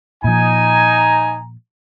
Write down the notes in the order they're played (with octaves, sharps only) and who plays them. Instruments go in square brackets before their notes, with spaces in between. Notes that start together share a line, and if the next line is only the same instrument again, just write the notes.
[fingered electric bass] A#2 F3 [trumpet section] D#4 G#5 [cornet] A#5